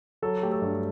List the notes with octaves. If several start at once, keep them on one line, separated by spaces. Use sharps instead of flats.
F#3 A4
A3 G4
A4
G2